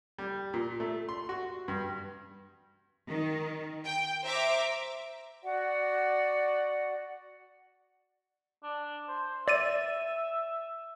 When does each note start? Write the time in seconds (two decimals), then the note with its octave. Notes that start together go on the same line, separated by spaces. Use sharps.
0.18 G3
0.54 A#2
0.80 A3
1.09 C6
1.29 F#4
1.68 G2
3.08 D#3
3.85 G5
4.23 C5 E5 A#5 D6
5.43 F#4 D5 F#5
8.63 D4
9.08 C5
9.48 D5 E5 A6 D#7